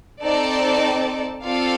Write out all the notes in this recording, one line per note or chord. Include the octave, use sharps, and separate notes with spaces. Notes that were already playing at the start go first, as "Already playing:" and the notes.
C4 D#4 A4 D5 A5
C4 F4 A4 D5 F5